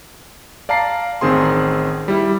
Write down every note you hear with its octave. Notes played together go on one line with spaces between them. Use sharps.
D5 F5 A5 A#5 C7
A1 D#3 C4 G#4 C6
G3 E4